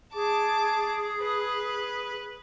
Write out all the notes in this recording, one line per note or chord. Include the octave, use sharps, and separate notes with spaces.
G#4 A5 D6
B4